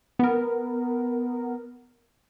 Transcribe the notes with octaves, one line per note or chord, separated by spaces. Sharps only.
B3 A#4